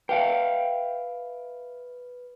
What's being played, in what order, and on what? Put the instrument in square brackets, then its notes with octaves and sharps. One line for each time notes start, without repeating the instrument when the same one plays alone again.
[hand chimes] B4 [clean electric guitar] E5 F5 G5